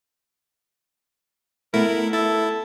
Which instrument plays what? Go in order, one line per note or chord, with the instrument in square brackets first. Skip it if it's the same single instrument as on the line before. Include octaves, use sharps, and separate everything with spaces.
[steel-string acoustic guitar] A3 B3 [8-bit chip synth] E4 [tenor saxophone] A#4
[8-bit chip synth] E4 [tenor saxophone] A4